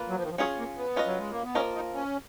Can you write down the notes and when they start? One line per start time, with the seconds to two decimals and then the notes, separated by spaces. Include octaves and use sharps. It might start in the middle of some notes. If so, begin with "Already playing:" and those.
Already playing: A#3 F4 B4
0.09 F#3
0.16 F3
0.23 D#3
0.30 F3
0.38 F#3 C#4 F4 G#4 C#5
0.58 A#3
0.77 B3
0.96 C#4 F4 B4 D#5
1.06 F#3
1.18 G#3
1.30 A#3
1.43 B3
1.55 F3 A#3 C#4 F4 A#4 D#5
1.75 D#4
1.94 C#4